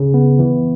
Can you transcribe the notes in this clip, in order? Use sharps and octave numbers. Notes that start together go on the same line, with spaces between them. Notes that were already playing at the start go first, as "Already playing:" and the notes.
Already playing: C#3
B3
E3